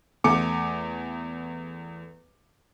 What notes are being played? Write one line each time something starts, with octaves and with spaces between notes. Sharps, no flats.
E2 A3 G#5 D6 C#7